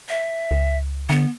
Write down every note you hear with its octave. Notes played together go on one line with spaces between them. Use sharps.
E5
C#2
D3 B3